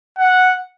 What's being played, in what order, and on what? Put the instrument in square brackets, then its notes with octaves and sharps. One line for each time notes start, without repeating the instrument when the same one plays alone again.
[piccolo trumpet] F#5